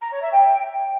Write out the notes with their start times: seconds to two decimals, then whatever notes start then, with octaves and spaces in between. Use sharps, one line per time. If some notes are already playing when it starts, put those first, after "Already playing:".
0.01 A#5
0.11 C#5
0.22 E5
0.32 G5